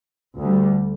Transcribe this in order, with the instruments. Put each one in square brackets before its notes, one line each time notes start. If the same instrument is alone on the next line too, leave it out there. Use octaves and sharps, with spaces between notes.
[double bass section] D2 D3 G3